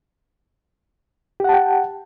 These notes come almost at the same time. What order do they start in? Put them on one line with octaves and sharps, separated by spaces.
G4 F#5 A5 G5